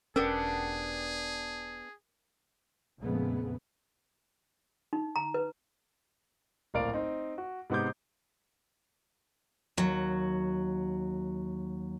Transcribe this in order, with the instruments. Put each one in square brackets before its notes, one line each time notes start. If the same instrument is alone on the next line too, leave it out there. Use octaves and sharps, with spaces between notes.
[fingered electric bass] E1 C#4 [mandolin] B3 D4 G4 [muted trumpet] G#4 [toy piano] A#4
[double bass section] A#1 F2 C#3 G#3 A3 B3
[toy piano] D#4
A#5
B4
[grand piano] D1 A#1 A#4 D5 F5 D7
C4 D#4
F#4
G#2 C3 B3 C5 D6 G6
[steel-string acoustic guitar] D#2 F#3